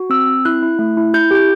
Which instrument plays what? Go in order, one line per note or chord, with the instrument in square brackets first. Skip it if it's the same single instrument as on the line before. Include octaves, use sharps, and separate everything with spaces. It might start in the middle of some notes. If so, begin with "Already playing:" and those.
Already playing: [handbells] F#4
C4 E6
C4
E4 F#6
E4
A3
E4
E4 G6
G4 G6